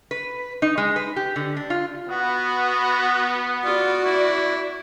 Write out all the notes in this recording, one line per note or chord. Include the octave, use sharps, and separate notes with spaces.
B4
D#4
G#3
B4
G4
D3
D4
F4
B3 F#4
F4 F#4 D5
E4